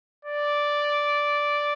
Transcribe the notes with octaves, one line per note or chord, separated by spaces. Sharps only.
D5